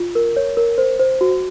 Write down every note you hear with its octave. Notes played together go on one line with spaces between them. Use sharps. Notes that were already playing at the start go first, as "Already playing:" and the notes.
Already playing: F4
A#4
C#5
A#4
C5
C5
F#4